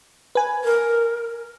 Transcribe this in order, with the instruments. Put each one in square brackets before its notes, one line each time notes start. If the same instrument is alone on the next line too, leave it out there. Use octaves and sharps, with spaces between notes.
[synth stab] B4 G#5
[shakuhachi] A#4